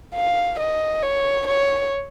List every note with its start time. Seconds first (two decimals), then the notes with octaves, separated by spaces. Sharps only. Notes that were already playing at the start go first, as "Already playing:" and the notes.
0.15 F5
0.60 D#5
1.02 C#5
1.47 C#5